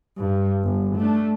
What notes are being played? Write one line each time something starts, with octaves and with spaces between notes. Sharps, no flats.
G2
G1
A3 D4